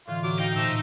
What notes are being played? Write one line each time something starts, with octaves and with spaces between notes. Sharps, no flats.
A2 D3 E3 F4
F#3 F#4 D6
D#4 F5 G5
A#2 A3 C4 E6